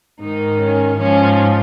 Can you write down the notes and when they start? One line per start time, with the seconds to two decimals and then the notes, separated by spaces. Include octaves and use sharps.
0.20 G#2 D#3 D#4
0.60 C#4
0.99 G#2 F3 C#4